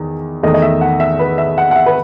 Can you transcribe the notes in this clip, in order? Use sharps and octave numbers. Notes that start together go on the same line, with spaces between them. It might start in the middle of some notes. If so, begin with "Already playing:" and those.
Already playing: E2 D#3
E2 D#3 A3 D#5
D#5
E5
F#5
E5
B4
E5
F#5
F#5
E5
B4